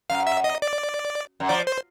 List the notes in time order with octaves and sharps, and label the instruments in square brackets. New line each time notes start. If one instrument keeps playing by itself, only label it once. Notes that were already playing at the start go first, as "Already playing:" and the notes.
[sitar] F#2 [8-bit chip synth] F5
[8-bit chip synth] E5
D#5
D5
[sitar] F#2
[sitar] F3 [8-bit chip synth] D5
[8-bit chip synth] C5